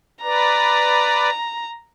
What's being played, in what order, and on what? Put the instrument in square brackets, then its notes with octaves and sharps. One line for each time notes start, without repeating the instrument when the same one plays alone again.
[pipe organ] B4 D5 [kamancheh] A#5